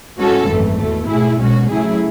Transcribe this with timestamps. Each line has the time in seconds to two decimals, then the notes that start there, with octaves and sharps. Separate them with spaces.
0.19 A2 G#3 C#4 F#4 A4
0.49 G#1 F#2 E3 A3
0.79 E2 B2 A3
1.09 B2 A3 E4 G#4
1.39 B1 B2 G#3 C#4 F#4
1.69 C#3 F#3 A3 E4 G#4